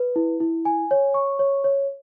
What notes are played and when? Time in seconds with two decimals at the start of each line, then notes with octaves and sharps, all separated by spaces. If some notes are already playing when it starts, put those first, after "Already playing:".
Already playing: B4
0.16 E4
0.40 E4
0.65 G#5
0.91 C#5
1.14 C#6
1.39 C#5
1.64 C#5